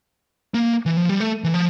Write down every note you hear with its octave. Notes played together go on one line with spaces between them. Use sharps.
A#3
E3
F3
G3
A3
E3
F3